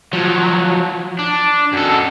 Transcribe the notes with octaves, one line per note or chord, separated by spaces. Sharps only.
F3 F#3
D4
F#2 A4